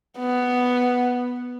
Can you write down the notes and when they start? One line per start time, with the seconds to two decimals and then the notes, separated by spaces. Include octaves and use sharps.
0.19 B3